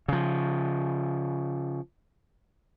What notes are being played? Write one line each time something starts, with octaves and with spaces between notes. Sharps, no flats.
C#3 F3